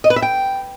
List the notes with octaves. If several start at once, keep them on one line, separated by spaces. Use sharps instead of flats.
D#5
B4
E5
G5